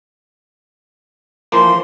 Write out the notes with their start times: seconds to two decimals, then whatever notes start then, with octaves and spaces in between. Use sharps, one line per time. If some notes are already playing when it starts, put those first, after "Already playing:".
1.52 E3 F3 A#3 C6